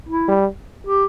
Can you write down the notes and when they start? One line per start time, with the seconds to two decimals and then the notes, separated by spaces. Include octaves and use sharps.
0.09 E4
0.29 G3
0.87 G4